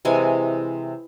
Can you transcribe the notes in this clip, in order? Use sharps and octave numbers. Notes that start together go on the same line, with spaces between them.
C3 E3 G#3 G#5